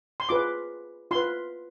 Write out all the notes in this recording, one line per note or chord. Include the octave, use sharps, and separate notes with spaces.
C6
F4 G#4 B4 D6
F4 B4 C6